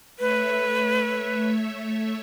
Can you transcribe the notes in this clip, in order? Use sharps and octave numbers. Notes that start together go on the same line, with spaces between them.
A3 B4 C#5 E5